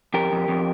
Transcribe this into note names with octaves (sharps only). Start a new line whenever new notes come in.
F2 G4 A#4
F2
F2